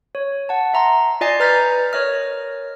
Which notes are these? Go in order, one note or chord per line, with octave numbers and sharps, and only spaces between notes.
C#5
F#5 A5
E5 A#5 C6
F4 D5 D#5 G#5 C7
B4 A#5 F6 G6 A6 B6
A#4 C#5 D#5 F6